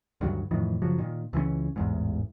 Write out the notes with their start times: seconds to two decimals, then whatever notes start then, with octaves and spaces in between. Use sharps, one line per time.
0.21 D2 G2 D#3 F#3
0.51 F2 A2 D#3 E3
0.82 F#2 C#3 F3 F#3
0.98 A#2 D#3
1.33 C#2 E3 G#3 C#4
1.76 A1 E2 G#2